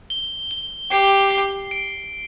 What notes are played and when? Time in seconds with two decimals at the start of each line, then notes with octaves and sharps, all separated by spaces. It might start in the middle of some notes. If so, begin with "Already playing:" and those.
0.10 G7
0.51 G7
0.90 G4 C7
1.31 C7
1.71 D7